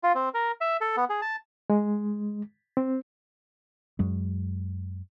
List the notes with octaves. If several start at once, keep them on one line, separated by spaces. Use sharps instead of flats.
F4
C4
A#4
E5
A4
B3
G#4
A5
G#3
C4
F#2 F#3 G#3